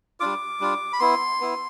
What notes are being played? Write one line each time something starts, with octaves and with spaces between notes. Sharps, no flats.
G3 D4 F4 D6
G3 D4 F4
B5
B3 E4 C6
B3 E4